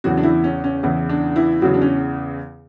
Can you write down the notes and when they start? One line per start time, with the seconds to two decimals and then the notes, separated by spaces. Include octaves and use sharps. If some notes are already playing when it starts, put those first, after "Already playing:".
0.04 E2 C#3 E3 F#3 F#4
0.18 D4
0.23 E3 E4
0.44 C#4
0.64 C#4
0.83 E2 C#3 E3 E4
1.09 D4
1.36 E3 E4
1.62 E2 C#3 E3 F#3 F#4
1.74 D4
1.82 C#4